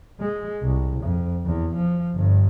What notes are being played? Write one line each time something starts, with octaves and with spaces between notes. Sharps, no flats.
G#3
C2
F2
E2
F3
G1 G2